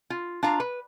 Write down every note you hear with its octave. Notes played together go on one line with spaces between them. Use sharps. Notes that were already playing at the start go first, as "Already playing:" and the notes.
F4
D4 F4 F5 A#5
B4